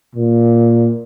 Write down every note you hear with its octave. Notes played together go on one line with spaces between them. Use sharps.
A#2